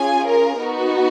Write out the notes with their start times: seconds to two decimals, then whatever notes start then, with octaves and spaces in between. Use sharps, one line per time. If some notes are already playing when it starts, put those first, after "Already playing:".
Already playing: C#4 F4 G#4 G#5
0.26 A#4
0.60 B3 D#4 F#4